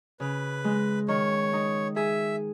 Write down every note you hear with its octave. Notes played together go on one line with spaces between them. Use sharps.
C#3 B4
G#3
D#3 C#5
D#4
G#4 E5